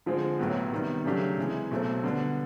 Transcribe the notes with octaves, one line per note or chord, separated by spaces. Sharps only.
D3 F3 G#3 C4
B1 A2 F#3 B3
C3 D#3 G3 B3
C#3 F#3 A3 D4 G4
C3 E3 G#3
B1 B2 F#3 A3 C4
D3 G3 B3